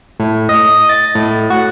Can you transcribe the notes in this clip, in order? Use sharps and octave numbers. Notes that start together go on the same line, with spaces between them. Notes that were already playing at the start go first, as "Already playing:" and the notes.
A2
D#5
A6
A2
F#4